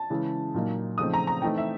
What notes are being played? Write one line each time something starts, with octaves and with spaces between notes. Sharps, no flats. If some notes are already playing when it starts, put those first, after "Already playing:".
Already playing: A5
C#3 E3 G#3 C#4 E4
A#2 F#3 A#3 D#4
C#3 F3 A3 C4 D#4 D#6
A#5
A#5
E3 A3 C4 D#4 G5
E5